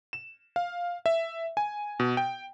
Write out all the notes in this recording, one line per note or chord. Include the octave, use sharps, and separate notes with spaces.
E7
F5
E5
G#5
B2
G5